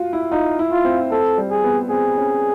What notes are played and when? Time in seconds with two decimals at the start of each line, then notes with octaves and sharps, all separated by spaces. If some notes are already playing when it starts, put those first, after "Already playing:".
Already playing: F4 F#4
0.13 E4
0.32 D#4 F4
0.59 E4
0.72 F4
0.85 C4
1.11 C4 A4
1.38 G3
1.51 G#4
1.64 B3
1.90 C4 G#4
2.18 C#4